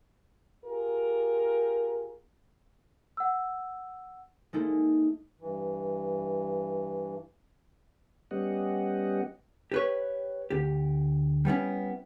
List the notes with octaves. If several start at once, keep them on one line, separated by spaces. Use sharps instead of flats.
F4 G4 G#4 A#4
F#5 E6
G#3 A#3 D#4 E4 A4
G2 E3
G3 B3 C#4 G4 D#5 F#5
G4 B4 C#5
D2 G4
G3 B3 C#4 E4